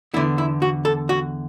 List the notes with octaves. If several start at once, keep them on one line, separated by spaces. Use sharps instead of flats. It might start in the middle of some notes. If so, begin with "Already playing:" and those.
E2 D3 B3 E4
E4
F#4
A4
F#4